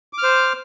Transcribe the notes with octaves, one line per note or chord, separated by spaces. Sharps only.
C5 D6 F6